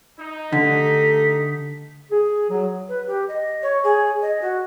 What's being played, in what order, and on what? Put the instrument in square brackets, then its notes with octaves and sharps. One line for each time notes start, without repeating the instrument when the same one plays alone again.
[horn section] D#4
[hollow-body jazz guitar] D3 [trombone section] A3 G4 A4 [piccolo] B6
[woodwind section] G#4
F#3
[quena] B4
G4
D#5
C#5
G#4
D#5
F#4